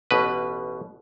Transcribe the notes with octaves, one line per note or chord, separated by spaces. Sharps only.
A1 B2 B4